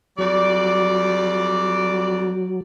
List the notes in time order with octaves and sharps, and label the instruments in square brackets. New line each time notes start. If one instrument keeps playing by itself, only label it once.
[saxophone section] F2 G3 D5 [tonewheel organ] F#3